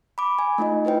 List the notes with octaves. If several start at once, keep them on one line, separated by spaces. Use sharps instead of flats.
B5 D6
G#5
A3 D#4 F4 D#5
E4 B4 C5 G5